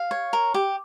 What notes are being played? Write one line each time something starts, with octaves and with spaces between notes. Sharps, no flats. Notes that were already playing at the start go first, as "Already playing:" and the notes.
Already playing: F5
C#5
A#4
G4